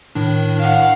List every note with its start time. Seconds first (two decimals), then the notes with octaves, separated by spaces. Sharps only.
0.15 A2 D#3 D4
0.60 F5 F#5